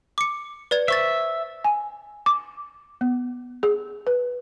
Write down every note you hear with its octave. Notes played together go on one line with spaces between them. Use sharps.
D6 C#7
B4 D5 G#6
C5 E5 C#6 A6
G#5
D6
B3
G#4
B4